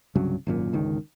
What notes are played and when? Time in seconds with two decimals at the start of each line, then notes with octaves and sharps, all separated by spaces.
0.16 C2 G2 C#3 F#3
0.47 G#1 F#2 A#2
0.73 G1 C#2 D#3